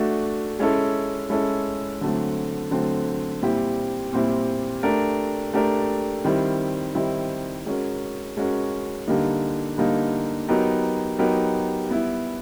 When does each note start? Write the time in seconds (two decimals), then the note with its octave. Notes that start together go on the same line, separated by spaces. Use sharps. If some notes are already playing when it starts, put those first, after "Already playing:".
Already playing: A3 D4 F#4
0.59 G#3 C#4 E4 A4
1.30 G#3 C#4 E4 A4
2.01 D3 F#3 A3 C4
2.71 D3 F#3 A3 C4
3.41 A#2 G3 C4 E4 G4
4.13 A#2 G3 C4 E4 G4
4.83 A3 D4 G4 A#4
5.53 A3 D4 G4 A#4
6.25 D#3 G3 C4 E4
6.95 D#3 G3 C4 E4
7.66 G#3 C#4 F#4 A#4
8.37 G#3 C#4 F#4 A#4
9.07 D3 G3 A#3 D#4
9.78 D3 G3 A#3 D#4
10.49 F#3 B3 D#4 G4 A#4
11.18 F#3 B3 D#4 G4 A#4
11.90 G3 B3 E4